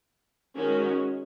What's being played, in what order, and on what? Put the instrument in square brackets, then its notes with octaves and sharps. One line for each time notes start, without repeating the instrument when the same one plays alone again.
[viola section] D#3 G#3 C#4 F#4